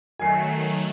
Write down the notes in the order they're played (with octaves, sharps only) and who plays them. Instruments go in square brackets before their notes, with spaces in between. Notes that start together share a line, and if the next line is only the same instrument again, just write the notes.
[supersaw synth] D#3 F#3 A3 [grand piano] G#5 C7